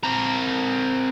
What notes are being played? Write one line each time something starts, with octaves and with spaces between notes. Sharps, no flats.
C4 A#4